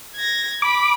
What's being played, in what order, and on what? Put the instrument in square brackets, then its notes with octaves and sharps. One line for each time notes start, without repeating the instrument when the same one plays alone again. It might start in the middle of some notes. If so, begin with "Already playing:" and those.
[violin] G#6 A#6
[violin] B5 [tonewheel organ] D6